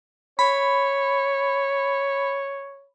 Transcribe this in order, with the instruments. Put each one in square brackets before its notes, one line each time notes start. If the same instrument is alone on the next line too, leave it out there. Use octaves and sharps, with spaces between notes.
[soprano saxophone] C#5 [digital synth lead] B5